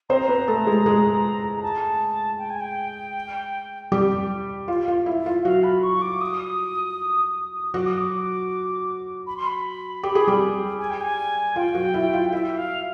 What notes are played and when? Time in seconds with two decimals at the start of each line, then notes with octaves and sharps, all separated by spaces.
0.10 C4 C5 A#5
0.28 B3 B4
0.48 A3 A4
0.67 G#3 G#4
0.86 G#3 G#4
1.56 A#5
1.63 A5
2.39 G5
2.50 G#5
2.61 G5
3.92 G3 G4
4.68 F4
4.88 F4
5.06 E4
5.26 F4
5.45 F#3 F#4 F5
5.63 B5
5.83 C#6
6.02 D6
6.21 D#6
7.74 F#3 F#4 D6
7.86 D#6
7.97 D6
9.27 B5
9.37 C6
9.46 B5
10.03 G4
10.15 G#4
10.27 G3 G4
10.79 G#5
10.90 G5
11.01 G#5
11.56 F4 G5
11.75 F#3 F#4
11.94 E4
12.13 F4
12.32 E4 E5
12.58 F5